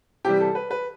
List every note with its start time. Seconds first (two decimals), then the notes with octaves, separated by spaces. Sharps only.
0.25 C3 E3 G3 G4
0.40 A4
0.55 B4
0.71 B4